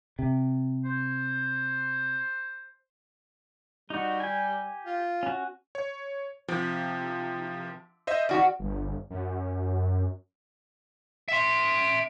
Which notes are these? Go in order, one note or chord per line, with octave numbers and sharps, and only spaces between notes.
C3
C5
G3 D#4 F#4
G4 G#5
F4
C#4 F#4
C#5
C3 F3
C5 D#5 E5
C#3 F#4 D5
G1
F#2
E5 C6